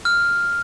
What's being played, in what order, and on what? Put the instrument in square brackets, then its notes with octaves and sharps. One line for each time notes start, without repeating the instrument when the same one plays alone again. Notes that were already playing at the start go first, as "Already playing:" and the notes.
[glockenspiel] F6